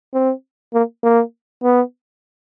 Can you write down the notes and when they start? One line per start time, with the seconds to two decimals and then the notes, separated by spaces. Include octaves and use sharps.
0.14 C4
0.74 A#3
1.03 A#3
1.63 B3